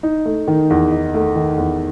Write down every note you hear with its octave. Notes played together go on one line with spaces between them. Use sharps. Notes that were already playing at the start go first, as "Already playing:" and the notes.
D#4
A3
D#3
E2
D#4
A3
D#3
E2